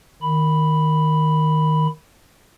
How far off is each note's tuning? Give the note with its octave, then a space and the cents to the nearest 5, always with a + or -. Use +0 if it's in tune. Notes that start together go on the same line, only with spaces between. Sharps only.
D#3 +0 B5 +0